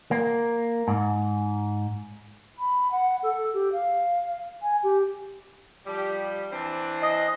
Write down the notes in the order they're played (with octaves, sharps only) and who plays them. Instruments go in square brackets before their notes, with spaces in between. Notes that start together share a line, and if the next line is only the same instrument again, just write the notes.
[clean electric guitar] A#3
G#2
[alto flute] B5
F#5
A4
G4
F5
G#5
G4
[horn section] F3 G3 G4
E3 C4 D4
[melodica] D#5